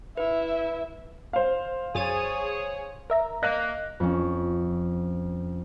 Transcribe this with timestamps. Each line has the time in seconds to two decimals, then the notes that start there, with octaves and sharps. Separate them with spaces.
0.17 E4 B4 E5
1.33 C5 F5
1.95 F#2 G#4 C#5 A6 D#7
3.10 A#4 E5 A#5
3.43 A#3 D#5 F#6 A#6
4.00 F2 C#4